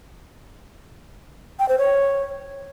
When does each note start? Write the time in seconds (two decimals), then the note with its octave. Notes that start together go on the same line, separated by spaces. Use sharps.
1.59 G5
1.69 C5
1.78 C#5